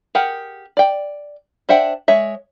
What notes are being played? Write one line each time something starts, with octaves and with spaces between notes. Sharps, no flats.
G4 G#4 A#4 F#5
D5 G5
D4 C5 E5 F#5 G5
G#3 C#5 E5